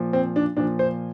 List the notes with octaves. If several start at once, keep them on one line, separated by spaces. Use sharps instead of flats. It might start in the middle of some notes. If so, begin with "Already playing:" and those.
Already playing: A#2 F3
C4
D4
A#2 F3 D4
C5